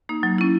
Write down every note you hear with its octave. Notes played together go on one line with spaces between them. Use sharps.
A#3 D#4
F#3
C#4 E4